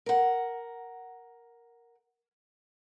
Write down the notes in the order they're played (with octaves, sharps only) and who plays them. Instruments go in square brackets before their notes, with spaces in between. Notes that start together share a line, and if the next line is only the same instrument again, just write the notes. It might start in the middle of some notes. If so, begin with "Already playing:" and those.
[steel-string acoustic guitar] A#4 F#5